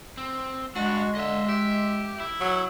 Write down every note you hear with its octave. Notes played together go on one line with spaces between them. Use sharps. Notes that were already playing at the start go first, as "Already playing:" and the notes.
C4
G2 G#3 D4 F#4
D3 D#5 E5
G4 E5
E4
F#3